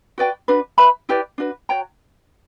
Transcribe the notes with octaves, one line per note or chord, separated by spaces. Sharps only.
F#4 B4 D5 G5
D4 F#4 B4
B4 E5 B5
E4 G4 B4 D5
D4 F#4 B4
F#4 C#5 G5 A#5